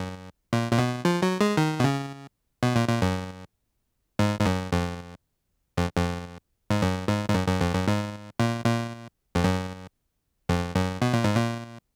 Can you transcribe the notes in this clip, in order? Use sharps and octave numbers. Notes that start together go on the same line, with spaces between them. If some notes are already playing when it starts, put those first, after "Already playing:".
Already playing: F#2
A#2
A#2
B2
F3
F#3
G#3
D#3
B2
C#3
B2
A#2
A#2
F#2
G#2
G#2
F#2
F2
F2
F2
G#2
F#2
G#2
G#2
F#2
F#2
F2
F#2
G#2
A#2
A#2
F2
F#2
F2
F#2
B2
A#2
G#2
A#2